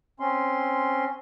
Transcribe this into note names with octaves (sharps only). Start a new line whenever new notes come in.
C4 C#4 C6